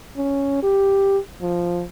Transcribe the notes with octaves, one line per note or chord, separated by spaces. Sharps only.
C#4
G4
F3